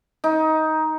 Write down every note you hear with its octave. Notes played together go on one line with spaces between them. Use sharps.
D#4